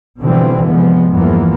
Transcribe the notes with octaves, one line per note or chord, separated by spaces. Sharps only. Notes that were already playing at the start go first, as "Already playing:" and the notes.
B2 D3 E3 F3 G3 C4
C3 F3 G#3 B3
E2 G2 E3 F3 A#3 B3